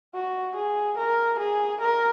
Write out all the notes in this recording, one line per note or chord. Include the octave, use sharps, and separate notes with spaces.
F#4
G#4
A#4
G#4
A#4